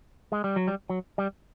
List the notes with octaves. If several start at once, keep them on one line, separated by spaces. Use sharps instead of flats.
G#3
G3
F#3
G3
F#3
G3